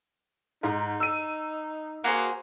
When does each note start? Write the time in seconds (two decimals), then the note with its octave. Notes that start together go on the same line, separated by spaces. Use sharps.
0.63 G#2 D#4
1.00 E6 D#7
2.04 A#3 F#4 G#4 C5